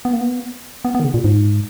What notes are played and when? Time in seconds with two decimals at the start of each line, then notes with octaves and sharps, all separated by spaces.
0.05 B3
0.13 A#3
0.21 B3
0.85 B3
0.95 B3
1.00 D#3
1.04 C#3
1.14 A#2
1.24 G#2